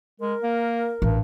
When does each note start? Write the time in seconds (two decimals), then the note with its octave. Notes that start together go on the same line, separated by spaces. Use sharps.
0.20 G#3 A#4
0.43 A#3
1.02 A1 G2